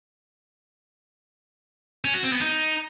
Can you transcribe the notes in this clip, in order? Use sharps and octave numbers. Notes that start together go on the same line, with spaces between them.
C#4
F#4
C4
B3
D#4